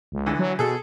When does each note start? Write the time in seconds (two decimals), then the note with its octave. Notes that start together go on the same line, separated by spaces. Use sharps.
0.12 C#2
0.26 D2 D3 E3
0.39 F#3
0.59 B2 G#4 A4